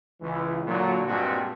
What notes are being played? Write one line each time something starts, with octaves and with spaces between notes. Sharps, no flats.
C#2 E3
A#2 D3 F#3
G2 A#2 G#3 C4 F#4